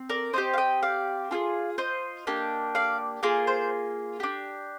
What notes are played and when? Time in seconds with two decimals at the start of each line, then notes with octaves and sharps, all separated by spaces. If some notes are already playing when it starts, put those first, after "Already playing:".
Already playing: C4
0.09 A#4 D5
0.33 C4 D#4 G4 C5 D#5
0.53 F5
0.58 D#5 G5
0.83 D5 F5
1.31 D4 F4 G#4
1.78 C5 D#5
2.27 A#3 D4 G4
2.75 D5 F5
3.23 A#3 F4 G#4 A#4
3.47 C5
4.20 D4 G4